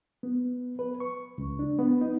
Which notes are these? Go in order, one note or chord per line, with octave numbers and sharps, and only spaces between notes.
B3
B4
C#6
C#2
D4
B3
D#4